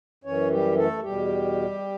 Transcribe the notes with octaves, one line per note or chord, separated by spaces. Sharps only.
F#2 E3 C#4 C#5
G3 G4
A3 A4
E2 B2 G3 G4